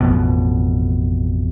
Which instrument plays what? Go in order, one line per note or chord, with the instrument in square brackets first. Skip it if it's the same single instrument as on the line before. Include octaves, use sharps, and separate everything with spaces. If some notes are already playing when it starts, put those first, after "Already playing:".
[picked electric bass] A1 F2 B2